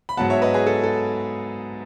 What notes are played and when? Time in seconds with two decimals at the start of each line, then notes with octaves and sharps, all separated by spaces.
0.09 B5
0.17 G#2 F#3 B3 F#5 A5
0.30 C#5 E5
0.42 B4 D#5
0.54 G#4 B4
0.67 A4
0.84 A4